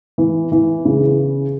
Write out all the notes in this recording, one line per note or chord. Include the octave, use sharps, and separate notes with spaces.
E3
E3
C#3